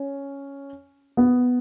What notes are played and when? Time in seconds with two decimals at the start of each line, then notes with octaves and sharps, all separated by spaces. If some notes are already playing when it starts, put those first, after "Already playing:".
Already playing: C#4
1.17 B3